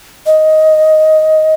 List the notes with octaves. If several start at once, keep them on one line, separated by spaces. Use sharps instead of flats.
D#5